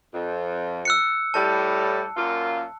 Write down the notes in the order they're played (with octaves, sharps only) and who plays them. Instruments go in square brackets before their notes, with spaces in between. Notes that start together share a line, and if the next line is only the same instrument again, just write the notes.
[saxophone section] F2
[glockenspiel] E6 F#6 C#7
[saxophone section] A2 G3 [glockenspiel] A5
[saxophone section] F#2 A#2 F4